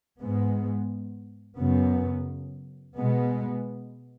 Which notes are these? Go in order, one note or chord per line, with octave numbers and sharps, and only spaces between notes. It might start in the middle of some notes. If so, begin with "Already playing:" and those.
G#2 G#3 B3
F#2 C#3 B3
B2 G#3 B3